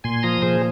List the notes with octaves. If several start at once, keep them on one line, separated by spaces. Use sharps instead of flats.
A#2 G#5 C6
F3 A#5 D#6
A#2 G#4 C5